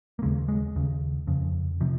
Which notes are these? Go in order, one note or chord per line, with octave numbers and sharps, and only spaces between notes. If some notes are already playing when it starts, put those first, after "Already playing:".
A#3
D#2 C#3 G#3
G#3
D#2 C#3
F2 C#3
C3 F3